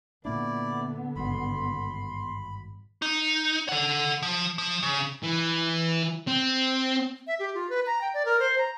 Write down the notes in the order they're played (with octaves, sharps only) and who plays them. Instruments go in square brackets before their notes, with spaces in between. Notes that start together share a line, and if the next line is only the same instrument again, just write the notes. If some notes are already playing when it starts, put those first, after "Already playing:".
[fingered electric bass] A#2 A#3 D4 [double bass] D3 B3 [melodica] E4 D5
[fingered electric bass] G#1 G2 B2 [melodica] B5 [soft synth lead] C6
[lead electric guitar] D#4
A4 F#5
F3
F3
C#3
[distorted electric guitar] E3
C4
[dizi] E5
G4
F4
B4
A#5
G5
D5
A#4
C5
A#5